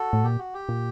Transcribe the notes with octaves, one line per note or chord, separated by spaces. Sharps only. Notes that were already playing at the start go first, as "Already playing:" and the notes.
Already playing: F#4 A4
A2
A#2 G4
F#4
G4
A#2